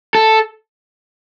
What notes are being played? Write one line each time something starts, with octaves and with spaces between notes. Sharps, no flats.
A4